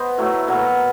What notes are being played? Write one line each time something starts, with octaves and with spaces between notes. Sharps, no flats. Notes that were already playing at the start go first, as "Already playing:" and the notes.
Already playing: B3 C5 D#5
A2 F#3 A3
B2 F#3 A#3